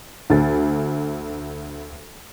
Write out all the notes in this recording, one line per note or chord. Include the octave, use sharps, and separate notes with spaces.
D2 A6